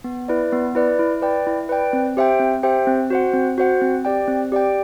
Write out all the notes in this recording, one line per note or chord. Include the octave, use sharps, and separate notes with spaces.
B3
E4 B4 D5
B3
E4 B4 D5
E4
B4 D5 G5
E4
B4 D5 G5
C4
G4 C5 E5 G5
C4
G4 C5 E5 G5
C4
F#4 C5 F#5
C4
F#4 C5 F#5
C4
G4 D5 G5
C4
G4 D5 G5